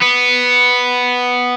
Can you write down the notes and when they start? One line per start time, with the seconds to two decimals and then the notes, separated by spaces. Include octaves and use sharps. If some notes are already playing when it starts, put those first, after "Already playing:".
0.01 B3